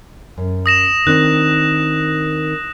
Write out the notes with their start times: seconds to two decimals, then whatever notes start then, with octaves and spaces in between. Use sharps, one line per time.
0.38 F#2
0.66 D#6 A#6 E7
1.07 D#3 C4 D4 F#6